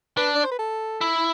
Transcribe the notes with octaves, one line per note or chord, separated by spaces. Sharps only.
D4 B4
D5
C5
B4
A4
E4